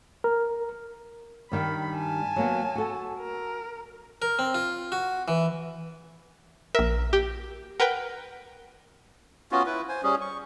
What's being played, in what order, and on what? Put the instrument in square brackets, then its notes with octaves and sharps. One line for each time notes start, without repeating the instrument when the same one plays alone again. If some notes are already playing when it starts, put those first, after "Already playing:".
[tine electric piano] A#4
[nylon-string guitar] G2 D#3 G3 [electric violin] B5
[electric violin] G#5 A5
[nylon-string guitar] F#3 A#3 B3
F#4 A4
[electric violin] A#4
[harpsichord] A#4
C4
F4
F#4
E3
[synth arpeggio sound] A#1 A#4 [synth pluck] E5
[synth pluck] G4
[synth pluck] A#4 B4 G5 [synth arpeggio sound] F#5
[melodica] B3 C#4 F4 F#4
E4 B4
C5 G#5
G3 C#4 G#4
C#6